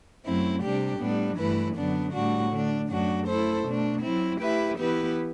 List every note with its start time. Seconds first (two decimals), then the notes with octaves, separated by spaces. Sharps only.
0.25 F#2 F#3 A3 C4 E4
0.61 C3 G3 D4 G4
0.99 A2 G3 B3 D4
1.37 G2 E3 A3 E4 B4
1.75 F#2 D3 F#3 B3 D4
2.13 A2 G3 D4 F#4
2.50 D3 A3 D4
2.89 F#2 F#3 A3 D4 F#4
3.27 A3 E4 A4 C5
3.64 B2 A3 D4
4.02 F#3 C4 E4
4.39 A3 E4 G4 B4 E5
4.78 E3 B3 E4 G4 B4